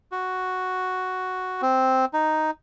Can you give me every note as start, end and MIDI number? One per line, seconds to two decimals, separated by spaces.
0.12 1.62 66
1.62 2.05 60
2.13 2.51 63